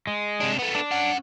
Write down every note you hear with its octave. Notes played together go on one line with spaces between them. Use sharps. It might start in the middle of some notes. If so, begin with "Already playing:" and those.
G#3
C3 D4
A3 B3
D4
C#4 F#5